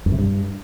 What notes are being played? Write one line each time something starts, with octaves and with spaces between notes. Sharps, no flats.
F#2
C3
G2